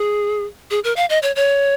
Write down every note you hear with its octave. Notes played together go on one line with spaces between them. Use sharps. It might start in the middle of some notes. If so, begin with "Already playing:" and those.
Already playing: G#4
G#4
A#4
F5
D#5
C#5
C#5